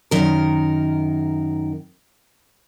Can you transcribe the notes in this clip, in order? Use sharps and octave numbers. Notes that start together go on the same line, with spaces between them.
F#2 D#3 A#4